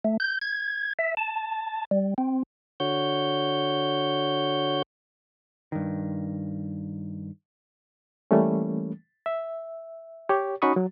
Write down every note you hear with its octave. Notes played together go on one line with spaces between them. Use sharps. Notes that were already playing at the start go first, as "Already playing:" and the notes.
A3
G6
G#6
E5
A5
G3
C4
D3 F#4 C#5 G6
G2 D#3
E3 G3 A3 A#3 C#4
E5
G4 C#5
C#4 D#4 F#4 B5 C#6 D#6
F#3